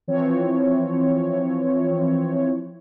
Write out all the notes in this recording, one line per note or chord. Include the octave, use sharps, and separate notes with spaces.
E3 F3 C4 C#5